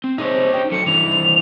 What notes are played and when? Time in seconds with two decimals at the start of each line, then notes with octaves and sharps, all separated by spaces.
0.04 C4
0.18 C3 G#3 C4 D#4 C#5
0.54 C#4 D4 F#4 G5
0.72 F#3 A4 C#7
0.87 C2 F#2 E3 E4 F7
1.11 D#3 F3